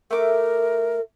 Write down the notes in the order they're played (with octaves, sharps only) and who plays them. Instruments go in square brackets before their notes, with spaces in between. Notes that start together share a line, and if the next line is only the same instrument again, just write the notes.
[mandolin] A3 D6 [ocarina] A#4